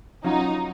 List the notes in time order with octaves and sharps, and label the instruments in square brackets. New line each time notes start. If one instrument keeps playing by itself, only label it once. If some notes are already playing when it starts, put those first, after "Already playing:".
[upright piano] F#3 C#4 F4 [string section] D#4